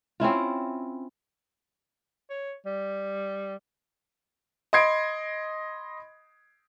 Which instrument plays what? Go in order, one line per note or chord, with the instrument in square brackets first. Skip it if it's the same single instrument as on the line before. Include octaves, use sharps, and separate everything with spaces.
[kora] C4 C#4 E4 F4
[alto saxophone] C#5
G3
[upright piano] D#5 B5 C6 G#6 C7 D7